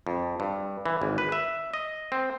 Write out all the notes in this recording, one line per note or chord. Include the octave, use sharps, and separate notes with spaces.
F2
G2
E3
G#1
B4
E5
D#5
C4